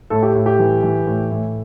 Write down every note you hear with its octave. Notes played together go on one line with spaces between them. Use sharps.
A2 A4
G4
A2
G4
E3
E3
A2
A2